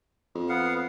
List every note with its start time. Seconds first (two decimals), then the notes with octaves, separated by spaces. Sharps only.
0.35 F2
0.49 B3 F5 F#5